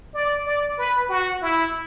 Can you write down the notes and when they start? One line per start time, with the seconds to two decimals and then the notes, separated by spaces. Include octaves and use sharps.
0.14 D5
0.46 D5
0.78 B4
1.09 F#4
1.41 E4